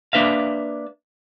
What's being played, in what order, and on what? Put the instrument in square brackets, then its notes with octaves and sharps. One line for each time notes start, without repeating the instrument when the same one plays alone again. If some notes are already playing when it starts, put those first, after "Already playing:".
[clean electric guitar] A#3 D4 B4 E5 F5